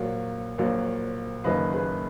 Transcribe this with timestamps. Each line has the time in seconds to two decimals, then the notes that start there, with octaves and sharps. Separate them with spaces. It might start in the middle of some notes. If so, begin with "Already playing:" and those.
Already playing: A#1 A#2 F#3 A#3 C#5 F5
0.58 A#1 A#2 F#3 A#3
1.44 F#1 F#2 D#3 A#3 D#4 B4 D#5
1.73 G#4 B4